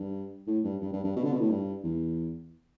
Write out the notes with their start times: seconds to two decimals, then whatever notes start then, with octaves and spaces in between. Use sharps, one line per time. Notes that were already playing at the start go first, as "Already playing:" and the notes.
Already playing: G2
0.47 A2
0.64 G2
0.81 G2
0.93 G2
1.04 G2
1.16 B2
1.24 D3
1.33 B2
1.41 A2
1.50 G2
1.84 E2